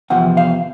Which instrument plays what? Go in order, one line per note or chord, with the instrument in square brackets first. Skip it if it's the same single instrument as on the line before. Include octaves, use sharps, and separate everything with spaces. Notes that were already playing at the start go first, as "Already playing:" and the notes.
[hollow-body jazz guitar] E2 C3 F3 F#5
F5